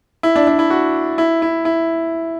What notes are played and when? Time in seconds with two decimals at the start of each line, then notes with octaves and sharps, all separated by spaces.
0.23 E4
0.36 D4
0.47 D4
0.59 E4
0.70 F#4
1.18 E4
1.42 E4
1.65 E4